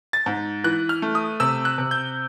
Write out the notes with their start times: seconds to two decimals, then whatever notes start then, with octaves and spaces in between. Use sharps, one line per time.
0.13 A6
0.26 G#2
0.64 E3 F#6
0.89 F6
1.02 A3
1.15 D#6
1.40 C3 E6
1.65 F#6
1.78 C3
1.91 G6